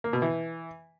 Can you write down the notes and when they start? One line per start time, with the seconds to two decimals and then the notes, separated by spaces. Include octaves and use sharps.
0.04 A#3
0.13 B2
0.22 E3